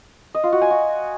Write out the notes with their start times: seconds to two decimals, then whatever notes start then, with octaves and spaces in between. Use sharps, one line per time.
0.35 D#5
0.43 F4
0.52 F#4
0.61 G#5
0.70 F#4